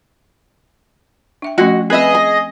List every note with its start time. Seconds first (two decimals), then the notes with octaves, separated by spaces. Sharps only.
1.42 D4 E5 G5
1.58 F3 A3 C#4 F#4 D#5
1.90 C4 G#4 B4 D#5 E5
2.15 G#5